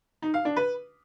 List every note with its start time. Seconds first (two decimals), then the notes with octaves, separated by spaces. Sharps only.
0.22 D#4
0.34 F5
0.45 D4
0.56 B4